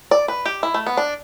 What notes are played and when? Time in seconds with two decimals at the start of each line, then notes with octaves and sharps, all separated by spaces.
0.11 D5
0.28 B4
0.46 G4
0.63 E4
0.74 A3
0.87 B3
0.97 D4